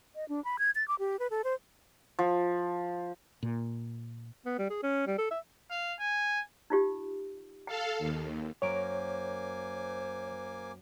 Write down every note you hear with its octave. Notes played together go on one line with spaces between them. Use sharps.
D#5
D4
B5
G#6
A6
D6
G4
B4
A4
C5
F3
A#2
B3
G3
G#4
C#4
G3
A4
E5
F5
G#5
D#4 F4 G4
A4 F5 G5
D#2
F#2 A#3 A#4 C5 C#5 G#5 D6 D7